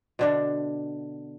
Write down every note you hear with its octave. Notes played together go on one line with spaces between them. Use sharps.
B2 D3 D4